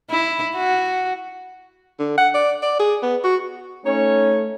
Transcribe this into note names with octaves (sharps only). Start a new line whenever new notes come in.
E4
F#4
D3
F#5
D5
D5
G#4
B3
F#4
A3 C#4 D#4 C#5